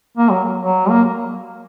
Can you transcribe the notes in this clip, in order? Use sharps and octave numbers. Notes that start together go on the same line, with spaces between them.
A#3
F#3
F#3
A#3